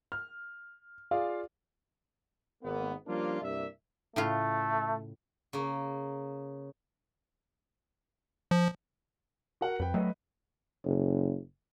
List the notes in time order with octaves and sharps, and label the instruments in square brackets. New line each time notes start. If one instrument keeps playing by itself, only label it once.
[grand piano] F6
F4 G#4 D5 F5
[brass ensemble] G#1 A#3 B3
F3 G3 A#3 C#4 D4 F4
C2 G2 A#3 D5 E5
[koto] A2 C#3 F4 [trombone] A3
[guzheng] C#3 A#3
[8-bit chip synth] F3
[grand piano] F#4 A#4 F#5
[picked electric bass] F2 [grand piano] B4 G5
[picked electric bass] F#3 A3 [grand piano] B4 D#5
[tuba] F#1